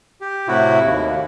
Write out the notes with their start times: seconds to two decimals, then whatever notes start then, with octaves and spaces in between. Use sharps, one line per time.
0.21 G4
0.48 A2 C3 E4 F#4
0.84 D#2